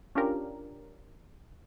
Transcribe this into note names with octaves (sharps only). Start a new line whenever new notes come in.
C#4 D4 F4 G4 A#4